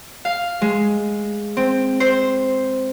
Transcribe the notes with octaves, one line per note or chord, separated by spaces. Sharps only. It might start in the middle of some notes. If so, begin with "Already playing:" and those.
F5
G#3
C4
C5